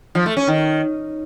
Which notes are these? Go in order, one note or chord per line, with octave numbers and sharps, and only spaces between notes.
F3
A3
C#4
D#3